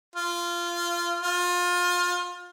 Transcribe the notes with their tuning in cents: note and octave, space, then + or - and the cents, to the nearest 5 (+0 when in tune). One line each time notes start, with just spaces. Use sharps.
F4 -15
F4 +25